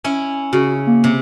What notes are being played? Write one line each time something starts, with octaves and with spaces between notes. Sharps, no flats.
C#4 E4
C#3 F#4
A#3
C3